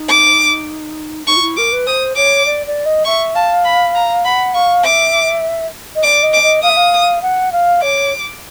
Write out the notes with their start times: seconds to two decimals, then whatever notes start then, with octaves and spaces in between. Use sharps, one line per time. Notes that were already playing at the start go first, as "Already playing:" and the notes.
Already playing: D#4
0.09 D6
1.27 D#4 C#6
1.36 F4
1.41 E4
1.57 A#4 D6
1.72 B4
1.87 C5 D#6
2.16 C#5 D6
2.45 D5
2.67 D5
2.85 D#5
3.05 E5 C#6
3.35 F5 A5
3.65 B5
3.95 A#5
4.25 F#5 B5
4.54 F5 C#6
4.84 E5 D6
5.95 D#5
6.03 D5 D6
6.23 D#5
6.33 D6
6.42 D#5
6.62 F5 D#6
6.69 E5
6.76 F5
7.22 F#5
7.52 F5
7.82 C#5 D6